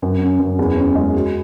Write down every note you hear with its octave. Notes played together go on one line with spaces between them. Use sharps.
F#2
C#4
F#2
E2
C#4
G#3
F#4